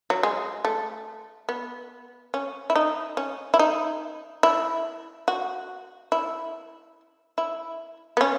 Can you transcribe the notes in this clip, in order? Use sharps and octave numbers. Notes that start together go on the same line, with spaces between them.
F#3
G#3
A3
B3
C#4
E4
D#4
C#4
E4
D#4
E4
F#4
E4
E4
B3
C#4